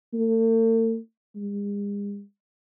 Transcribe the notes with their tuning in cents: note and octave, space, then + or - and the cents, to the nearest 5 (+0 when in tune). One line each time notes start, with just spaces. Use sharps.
A3 +45
G#3 -45